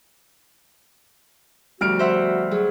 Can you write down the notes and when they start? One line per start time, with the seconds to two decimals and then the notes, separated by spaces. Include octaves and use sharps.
1.81 D2 F3 G3 B3 F#4 F6 D7
1.99 C5 E5 F#5
2.51 F#3 G#4